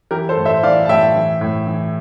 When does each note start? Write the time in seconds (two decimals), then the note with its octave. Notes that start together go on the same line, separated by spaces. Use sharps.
0.11 E3 G4 A#4
0.29 A4 C5
0.37 A2
0.45 C5 E5
0.63 E3 D5 F5
0.85 A5
0.89 A2 E5 G5
1.15 E3
1.41 A2
1.67 E3